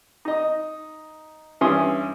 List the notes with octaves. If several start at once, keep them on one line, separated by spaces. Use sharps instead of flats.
D#4 D#5
G2 E3 C#4 E5 C6 D#6